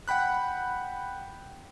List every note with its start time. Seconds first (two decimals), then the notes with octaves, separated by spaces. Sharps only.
0.08 F#5 G5 B5 F#6